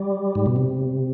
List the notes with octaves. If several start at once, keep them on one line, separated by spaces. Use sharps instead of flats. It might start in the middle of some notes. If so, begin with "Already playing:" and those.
Already playing: G3
G#2
B2
C3